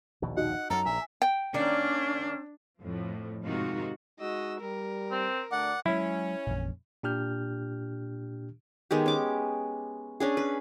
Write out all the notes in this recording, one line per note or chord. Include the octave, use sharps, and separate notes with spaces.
A#1 D#2 B2
D#4 F#4 F#5
F#2 F#3 A4 A#5
A#1 E5 G#5
G5
D#3 A#3 C#4 D4 D5
F2 A2 F3
G#2 C3 D#3 D#4 F4 F#4
G#3 D#4 F#4 D#5 E6
G3 A#4
C4
D2 A3 D4 D5 F#5
F#3 G#3 C#4 E4
A1 F2 A#2
A#2 D4 G4 F6 G6
D#3 G#3 B3 G4
C#4 D6
C#4 D4 G#4
B4